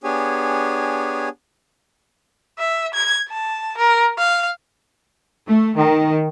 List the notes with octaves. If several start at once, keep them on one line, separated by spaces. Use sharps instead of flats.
B3 D4 G4 G#4 C#5 G#5
E5
G#6
A5
A#4
F5
A3
D#3